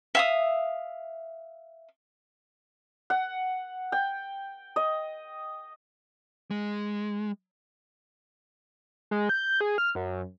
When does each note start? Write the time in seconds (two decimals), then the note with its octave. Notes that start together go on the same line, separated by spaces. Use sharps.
0.15 E5 F5 D#6
3.10 F#5
3.92 G5
4.76 D#5
6.51 G#3
9.11 G#3
9.29 G6
9.61 G#4
9.78 F6
9.95 F#2